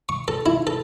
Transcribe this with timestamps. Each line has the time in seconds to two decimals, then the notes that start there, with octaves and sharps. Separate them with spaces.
0.09 C#6
0.28 A4
0.46 E4
0.67 A4